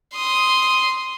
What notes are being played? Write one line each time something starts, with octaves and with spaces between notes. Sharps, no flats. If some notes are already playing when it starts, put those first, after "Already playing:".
C6 D#6